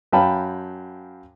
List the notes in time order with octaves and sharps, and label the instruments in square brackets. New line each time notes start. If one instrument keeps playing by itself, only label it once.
[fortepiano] F#2 F5 G5 A5 B5